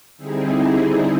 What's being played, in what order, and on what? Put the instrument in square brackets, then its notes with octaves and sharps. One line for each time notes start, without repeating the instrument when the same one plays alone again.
[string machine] D3 G3 C4 D#4 E4 G#4